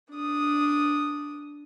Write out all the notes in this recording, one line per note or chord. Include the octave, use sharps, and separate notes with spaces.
D4 D#6